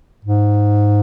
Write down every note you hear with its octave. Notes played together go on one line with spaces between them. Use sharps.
G#2